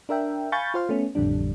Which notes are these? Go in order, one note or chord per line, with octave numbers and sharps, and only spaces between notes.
D4 A#4 E5 G5
F5 G#5 B5 C#6 G6 A6
F4 C5 F5
A3 B3 C#4
A1 F2 D3 G3 D4